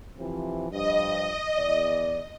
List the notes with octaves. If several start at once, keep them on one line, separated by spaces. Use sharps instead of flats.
C3 E3 F3
G2 F3 D#5
E2 D5